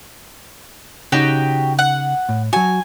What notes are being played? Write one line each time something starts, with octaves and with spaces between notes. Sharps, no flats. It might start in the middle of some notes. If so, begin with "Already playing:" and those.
C#3 D#4 F#4 G4 G5
F#5
A2
F#3 F#4 G#5